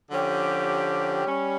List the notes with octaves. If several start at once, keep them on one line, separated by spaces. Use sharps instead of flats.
D3 F3 C#4 G4
G3 C#4